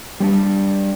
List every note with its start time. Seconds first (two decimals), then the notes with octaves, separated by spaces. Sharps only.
0.20 G3 B3 D4